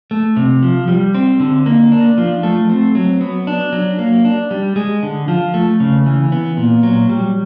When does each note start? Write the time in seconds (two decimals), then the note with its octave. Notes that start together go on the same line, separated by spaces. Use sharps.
0.11 A3
0.36 C3
0.63 F3
0.88 G3
1.15 C4
1.40 D3
1.66 A#3
1.92 D4
2.18 F3
2.43 A3
2.70 C4
2.95 F#3
3.21 B3
3.47 D4
3.72 F#3
3.99 A#3
4.25 D4
4.51 G3
4.76 G#3
5.03 D3
5.28 F3
5.54 A3
5.80 C#3
6.06 E3
6.32 B3
6.57 A#2
6.83 F#3
7.09 G3